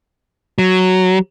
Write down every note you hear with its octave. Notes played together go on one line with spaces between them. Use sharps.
F#3